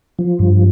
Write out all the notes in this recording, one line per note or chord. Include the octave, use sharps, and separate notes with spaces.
F3
G2